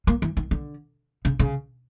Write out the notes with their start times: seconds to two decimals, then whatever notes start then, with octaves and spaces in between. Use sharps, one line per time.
0.07 A#3
0.22 E3
0.37 D#3
0.51 D3
1.25 C#3
1.39 C#3